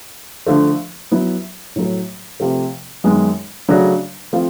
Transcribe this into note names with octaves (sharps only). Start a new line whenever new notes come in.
D3 F3 A3
F#3 B3 E4
A2 F#3 A3
C3 F3 A3
F#2 D#3 G#3 B3
C#3 F#3 A3 D4 F#4
F3 A3 C4 F4